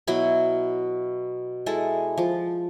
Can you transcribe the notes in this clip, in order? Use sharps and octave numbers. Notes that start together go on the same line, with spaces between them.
B2 F#3 E4 B5
G#3 E4 A4
F3